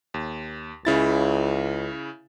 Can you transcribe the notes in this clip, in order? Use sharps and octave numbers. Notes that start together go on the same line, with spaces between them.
D#2
C#2 C#3 E4 A6